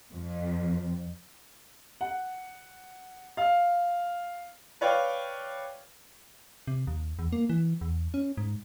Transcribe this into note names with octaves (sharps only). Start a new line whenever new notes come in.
F2
F#5
F5
B4 C#5 D5 F5 G5
C3
D#2
E2
A#3
E3
E2
C#4
G#2